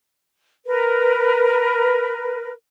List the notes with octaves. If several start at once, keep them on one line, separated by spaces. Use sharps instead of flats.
A#4 B4